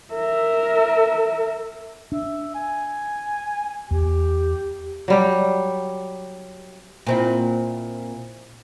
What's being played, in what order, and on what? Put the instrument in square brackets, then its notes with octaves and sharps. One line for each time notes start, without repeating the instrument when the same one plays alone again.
[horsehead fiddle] A#4 E5
[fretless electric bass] D4 [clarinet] E5
[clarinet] G#5
[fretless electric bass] E2 [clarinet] G4
[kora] F#3 G3 G4
[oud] A#2 C4 E4